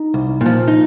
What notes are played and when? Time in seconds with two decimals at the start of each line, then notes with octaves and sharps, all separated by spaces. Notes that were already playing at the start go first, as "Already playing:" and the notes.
Already playing: D#4
0.14 C2
0.41 A#2 F3
0.68 D#4